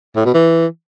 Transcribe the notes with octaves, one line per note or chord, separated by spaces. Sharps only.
A2
B2
E3